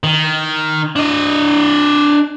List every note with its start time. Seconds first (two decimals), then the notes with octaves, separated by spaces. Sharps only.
0.04 D#3
0.96 D4 D#5